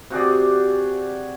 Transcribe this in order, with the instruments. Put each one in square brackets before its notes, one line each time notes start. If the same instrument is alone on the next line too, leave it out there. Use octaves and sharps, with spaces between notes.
[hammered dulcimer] C3 F#4 G#4 D5